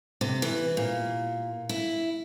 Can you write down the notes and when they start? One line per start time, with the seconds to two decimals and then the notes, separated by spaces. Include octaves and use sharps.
0.21 C3
0.42 E3
0.77 A#2
1.69 E4